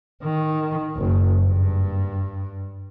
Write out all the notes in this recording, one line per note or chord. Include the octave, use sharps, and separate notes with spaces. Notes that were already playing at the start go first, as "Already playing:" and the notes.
D#3
F#1
G2